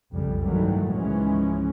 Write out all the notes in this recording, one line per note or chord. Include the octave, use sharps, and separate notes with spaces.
B1 F2 C#3 G3
G2 D#3 E3 F#3 G3 A3
C#2 G#2 E3 F3 G#3 C#4